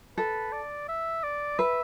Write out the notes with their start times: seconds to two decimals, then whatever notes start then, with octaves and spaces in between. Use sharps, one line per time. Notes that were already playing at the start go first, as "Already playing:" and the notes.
0.17 A4 B4
0.53 D5
0.89 E5
1.24 D5
1.59 B4 E5